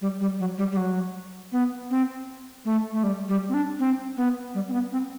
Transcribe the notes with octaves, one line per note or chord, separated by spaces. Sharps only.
G3
G3
F#3
G3
G3
F#3
B3
C4
A3
A3
G3
G3
C4
D4
C4
B3
G3
C4
B3
C4